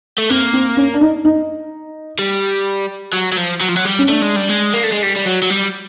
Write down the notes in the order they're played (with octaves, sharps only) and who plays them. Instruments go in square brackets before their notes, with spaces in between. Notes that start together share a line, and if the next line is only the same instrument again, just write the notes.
[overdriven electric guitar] A3
[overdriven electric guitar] A#3 [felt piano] C4
[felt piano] C4
C#4
D4
D#4
D#4
[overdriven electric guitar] G3
F#3
F#3
F3
F#3
F3
F#3
G3
[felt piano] C#4
[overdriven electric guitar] A3 [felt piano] D4
[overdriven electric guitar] G#3
G3
G#3
A#3
A3
G#3
G3
G3
F#3
F#3
G3